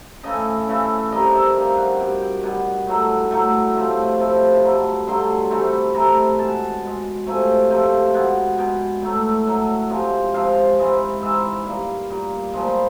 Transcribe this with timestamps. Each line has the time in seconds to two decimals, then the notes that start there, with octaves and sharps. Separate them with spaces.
0.23 C#3 E3 A3 D#5
0.67 C#3 E3 A3
1.12 C3 D#3 G3 D#5
1.34 E5
1.56 C3 D#3 G3 F5
1.77 F#5
2.00 B2 G3 G5
2.21 G5
2.43 B2 G3 F#5
2.87 A2 F#3 A3
3.31 A2 F#3 A3
3.76 C3 F3 A3
4.19 C3 F3 A3 B5
4.63 G2 D3 F#3 A3 B5
5.07 G2 D3 F#3 A3 C6
5.50 C3 E3 A3 C6
5.73 B5
5.94 C3 E3 A3 A#5
6.39 B2 G#3 A5
6.83 B2 G#3
7.26 C3 F3 A3 G#5
7.70 C3 F3 A3 G5
8.14 B2 G#3 F#5
8.58 B2 G#3 G5
9.02 A2 F#3 A3
9.46 A2 F#3 A3 F#5
9.90 C3 F3 G#3
10.34 C3 F3 G#3 F5
10.79 G#2 E3 G#3
11.21 G#2 E3 G#3 E5
11.66 A#2 G3 F5
12.09 A#2 G3
12.54 A#2 F3 G#3 C6
12.67 B5